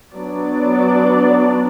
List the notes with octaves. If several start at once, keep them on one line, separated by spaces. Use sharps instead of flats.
F#3 B3 D4 D5